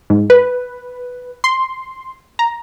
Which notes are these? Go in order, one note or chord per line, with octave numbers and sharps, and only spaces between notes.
G#2
B4
C6
A#5